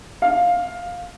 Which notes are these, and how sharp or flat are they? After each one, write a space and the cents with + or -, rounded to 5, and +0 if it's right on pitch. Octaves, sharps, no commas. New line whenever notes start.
F5 +15